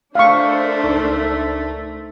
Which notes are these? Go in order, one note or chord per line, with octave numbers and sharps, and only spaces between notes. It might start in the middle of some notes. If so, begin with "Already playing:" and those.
A3 D4 A#4 C5 F5 C#6
C#2 D#4